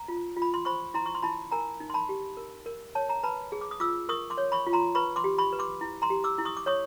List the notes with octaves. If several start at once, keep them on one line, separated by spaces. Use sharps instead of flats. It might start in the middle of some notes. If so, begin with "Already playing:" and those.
Already playing: A#5
F4
F4
B5
C6
C5 B5 C#6
E4 A#5 C6
C#6
C6
E4 A5 B5
A#4 G#5 A#5
D#4
C6
A5 B5
G4
A#4
A#4
C#5 A5
A#5
B4 A5 B5
G#4
D6
D#6
F4 D6 E6
A#4 C#6 D#6
C6 D6
C#5
B5 C#6
F4
A#5 C6
B4 B5 C#6
C6 D6
G4
B5 C#6
B4
C6 D6
E4
A#5 C6
G4
D6 E6
E4
C#6 D#6
D6
C#5 C#6 D#6